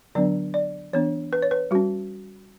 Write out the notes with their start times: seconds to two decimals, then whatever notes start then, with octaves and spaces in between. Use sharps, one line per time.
0.15 D3 F#3 B3 D4 D5
0.54 D5
0.93 E3 B3 D4 C#5
1.33 B4
1.42 C#5
1.51 B4
1.71 G3 C#4 F#4